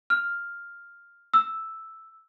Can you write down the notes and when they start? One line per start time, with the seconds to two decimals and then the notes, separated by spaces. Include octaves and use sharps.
0.10 F6
1.34 E6